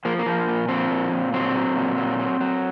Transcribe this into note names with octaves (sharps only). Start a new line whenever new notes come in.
F3 A#3
A#3
F3
A#2
F3 C4
A#2
A#2
F#3 C4
F#3
A#2
F#3
F#3
F#3